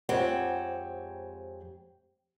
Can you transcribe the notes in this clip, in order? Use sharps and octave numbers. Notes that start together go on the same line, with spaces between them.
F2 G#3 C4 G4 C#5 F#5